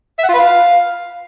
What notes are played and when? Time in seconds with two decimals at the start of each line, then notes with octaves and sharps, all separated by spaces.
0.19 E5
0.24 F#5
0.29 F4
0.34 B4
0.39 F5